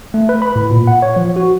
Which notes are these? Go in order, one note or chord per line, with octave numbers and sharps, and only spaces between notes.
A3
B4
B5
A2
A#2
F#5
C#5
F3
F#4